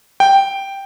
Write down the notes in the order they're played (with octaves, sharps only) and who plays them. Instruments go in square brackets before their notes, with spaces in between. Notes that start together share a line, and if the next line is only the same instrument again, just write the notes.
[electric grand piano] G5